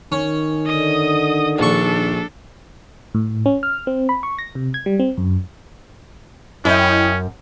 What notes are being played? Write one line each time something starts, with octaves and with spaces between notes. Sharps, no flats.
D#3 C#4
D3 D#5 D#6
A#1 D4 A4 C#6
A2
C#4
F6
C4
B5
C#6
A#6
C3
G#6
G3
C4
F#2
F#2 C#4 E4 D#5 G5